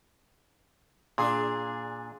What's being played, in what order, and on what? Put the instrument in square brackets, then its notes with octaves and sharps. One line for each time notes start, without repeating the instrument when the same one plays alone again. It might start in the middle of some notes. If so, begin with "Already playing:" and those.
[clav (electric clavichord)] A#2 [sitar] D4 G#4